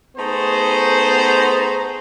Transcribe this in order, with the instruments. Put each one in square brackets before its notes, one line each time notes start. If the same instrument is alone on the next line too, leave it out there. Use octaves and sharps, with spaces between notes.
[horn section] A3 B3 D#4 G#4 C5